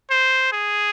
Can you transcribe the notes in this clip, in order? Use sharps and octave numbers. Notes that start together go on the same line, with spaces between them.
C5
G#4